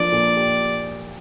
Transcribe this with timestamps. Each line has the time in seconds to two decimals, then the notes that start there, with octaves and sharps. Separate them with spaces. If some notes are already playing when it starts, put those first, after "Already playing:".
Already playing: F3 A#3 D4 D5
0.12 A#2
0.36 G4